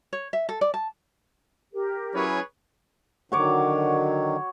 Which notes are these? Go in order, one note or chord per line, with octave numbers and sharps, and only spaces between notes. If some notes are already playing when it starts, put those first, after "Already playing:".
C#5
E5
A4
D5
A5
G4 A#4
F#3 C#4 E4 G#4 B4 C#5
D3 D#3 F#3 F#4 C#5 D6